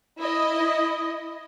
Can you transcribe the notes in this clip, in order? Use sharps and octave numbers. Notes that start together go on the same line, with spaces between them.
E4 D#5